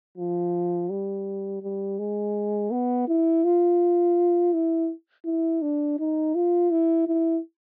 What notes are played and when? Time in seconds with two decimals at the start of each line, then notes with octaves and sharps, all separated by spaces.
0.18 F3
0.90 G3
1.62 G3
1.99 G#3
2.71 B3
3.08 E4
3.44 F4
4.53 E4
5.25 E4
5.62 D4
5.99 D#4
6.35 F4
6.71 E4
7.07 E4